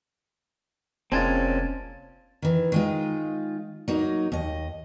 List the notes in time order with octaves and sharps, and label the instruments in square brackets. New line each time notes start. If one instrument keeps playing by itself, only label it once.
[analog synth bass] F1 [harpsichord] A#2 G#3 [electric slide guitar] C4 C#4 [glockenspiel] A5 G#6 A6
[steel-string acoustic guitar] D#3 E3
D#3 G#3 F4
F#3 A#3 D#4
D#2 D#5